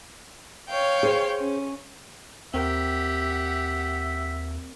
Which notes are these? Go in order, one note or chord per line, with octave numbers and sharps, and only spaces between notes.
C#5 F5 G5
G#4 C5
C#4
D#2 C4 G4 A#4 E5 F#5